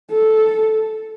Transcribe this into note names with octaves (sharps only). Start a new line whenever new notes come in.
A4